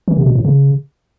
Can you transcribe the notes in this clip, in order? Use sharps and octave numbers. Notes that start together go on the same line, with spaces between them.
E3
C3
B2
A2
C#3